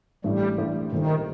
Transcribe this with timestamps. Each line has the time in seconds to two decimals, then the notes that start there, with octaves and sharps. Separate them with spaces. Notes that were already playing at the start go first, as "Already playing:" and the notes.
0.24 A1 A2 G3 A3 D4
0.58 A1 A2 A3 D4
0.92 A#2 D#3 G3 D4 A4 C5